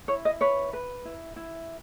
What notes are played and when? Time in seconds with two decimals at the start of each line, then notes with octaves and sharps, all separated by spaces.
0.08 E4 C#5
0.25 D#5
0.41 B4 C#5
0.73 B4
1.05 E4
1.36 E4